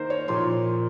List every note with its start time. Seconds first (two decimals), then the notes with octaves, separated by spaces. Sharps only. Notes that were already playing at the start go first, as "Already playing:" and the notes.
Already playing: D#3 A#3 A#4 C5
0.10 C#5
0.28 A#2 F3 A#3 C6